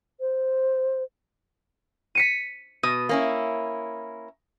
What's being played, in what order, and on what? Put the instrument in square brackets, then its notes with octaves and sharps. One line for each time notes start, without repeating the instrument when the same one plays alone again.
[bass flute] C5
[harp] B6 C#7 D#7
[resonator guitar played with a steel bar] B2 [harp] D#6
[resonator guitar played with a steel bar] A#3 C#4 E4